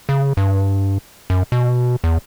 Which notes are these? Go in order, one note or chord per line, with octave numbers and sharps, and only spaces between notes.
C#3
G2
F#2
B2
E2